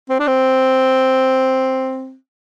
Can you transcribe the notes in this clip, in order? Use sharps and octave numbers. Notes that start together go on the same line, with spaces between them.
C4
D4
C4